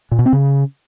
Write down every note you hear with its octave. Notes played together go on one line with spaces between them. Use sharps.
A#2
B2
C4
C#3